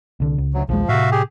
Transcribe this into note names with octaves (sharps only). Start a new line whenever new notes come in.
C2 D3
C#2
D2 F#3
A#1 D#2 F3 G#3
A2 C3 F#4 E5 F5
G4 G#4